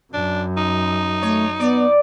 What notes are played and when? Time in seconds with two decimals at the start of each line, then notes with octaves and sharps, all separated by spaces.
0.13 F#2 D4
0.57 D#4
1.22 A3 C#5
1.60 B3 D5